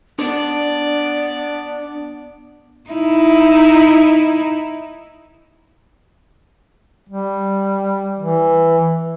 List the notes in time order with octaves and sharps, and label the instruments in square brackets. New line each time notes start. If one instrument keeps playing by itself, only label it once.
[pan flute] B3 [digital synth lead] D4 [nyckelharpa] D5
[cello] D#4 E4
[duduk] G3
E3